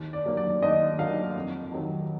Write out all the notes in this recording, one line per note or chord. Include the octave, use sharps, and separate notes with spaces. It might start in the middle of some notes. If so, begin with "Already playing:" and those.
Already playing: D#2
D5
D3 F#3 A#3
D5
D#2 D#5
D3 F#3 A#3 F5
F2
D#3 F#3